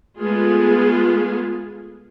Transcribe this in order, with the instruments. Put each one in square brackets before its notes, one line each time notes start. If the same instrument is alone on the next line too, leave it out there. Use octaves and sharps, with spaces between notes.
[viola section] G#3 A3 B3 F4 G#4